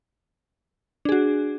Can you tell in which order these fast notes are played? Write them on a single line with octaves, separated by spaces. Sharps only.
D4 G#4 F#4